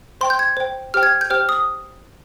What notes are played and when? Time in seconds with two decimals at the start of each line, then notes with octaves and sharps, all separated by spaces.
0.21 C5 G5 C6
0.30 G6
0.39 G#6
0.57 C5 G5
0.94 G4 C5 G5 F6
1.03 G#6
1.21 G6
1.30 G4 C5 G5 F6
1.49 D#6